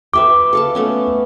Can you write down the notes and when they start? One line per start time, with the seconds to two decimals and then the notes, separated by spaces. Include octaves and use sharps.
0.14 B4 E5 G5 D6
0.53 A4 F5 A5
0.75 A3 B3 C#4